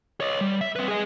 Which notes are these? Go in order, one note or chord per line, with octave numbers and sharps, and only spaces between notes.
C#5 D#5
G3
E5
C4 B4
G#4 D#5